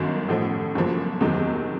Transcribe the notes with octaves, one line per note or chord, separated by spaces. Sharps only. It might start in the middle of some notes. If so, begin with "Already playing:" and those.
Already playing: G1 F#2 D#3
A1 A2 F3
G1 F#2 C#3 F3 A#3
F#1 E2 C3 D#3 F#3